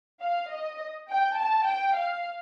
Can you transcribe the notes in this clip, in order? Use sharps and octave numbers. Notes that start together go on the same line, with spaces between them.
F5
D#5
G5
A5
G5
F5